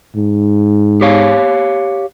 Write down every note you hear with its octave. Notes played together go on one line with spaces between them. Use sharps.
G#2
G4 C#5 F5